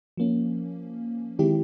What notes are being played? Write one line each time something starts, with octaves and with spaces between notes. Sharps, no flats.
F3 A#3 C#4
D#3 G#3 C4 E4 G4